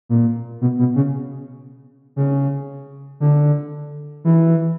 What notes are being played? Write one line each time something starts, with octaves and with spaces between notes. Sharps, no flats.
A#2
B2
B2
C#3
C#3
D3
E3